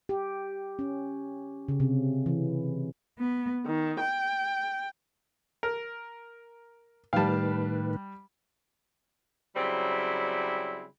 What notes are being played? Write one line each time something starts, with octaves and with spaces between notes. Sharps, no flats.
G4
C#4
C#3
C3
E3
B3
D#3
G5
A#4
A2 D#3 G3 B4 F5 G5 A5
C#3 F#3 G3 C4 E4